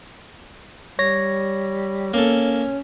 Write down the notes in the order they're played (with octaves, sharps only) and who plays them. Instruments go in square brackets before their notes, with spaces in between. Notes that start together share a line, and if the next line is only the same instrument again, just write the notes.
[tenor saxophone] G3 [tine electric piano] C#5 A#6
[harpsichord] A#3 A4 [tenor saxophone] C#4